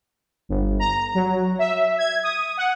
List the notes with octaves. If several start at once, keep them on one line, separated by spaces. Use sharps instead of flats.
G1
A#5
F#3
E5
G#6
D#6
F#5